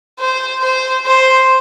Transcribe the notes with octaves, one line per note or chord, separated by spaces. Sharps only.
C5
C5
C5